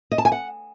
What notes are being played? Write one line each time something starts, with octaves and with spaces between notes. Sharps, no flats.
D#5
A5
G#5
F#5